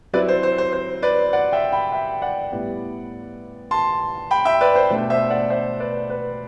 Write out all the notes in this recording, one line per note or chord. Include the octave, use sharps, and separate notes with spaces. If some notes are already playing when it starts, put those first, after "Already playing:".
F#3 C4 E4 B4 D5
C5
C5
C5
C5
B4 D5
D5 F#5
E5 G5
G5 B5
E5 G5
D5 F#5
A2 G3 B3 E4
A5 C6
G5 B5
E5 G5
B4 D5
C5
B2 A3 D4
C5 E5
D5 F#5
C5 E5
B4 D5
B4